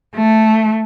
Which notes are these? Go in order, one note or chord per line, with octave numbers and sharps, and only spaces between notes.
A3